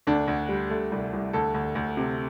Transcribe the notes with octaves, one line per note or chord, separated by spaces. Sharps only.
D2 D4
D2
G3
A3
C2
C2
D2 A4
D2
D2
C3